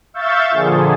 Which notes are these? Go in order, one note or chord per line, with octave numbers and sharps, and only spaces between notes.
E5 F5 C#6 E6 G6 A6
A#2 D3 F3 G#4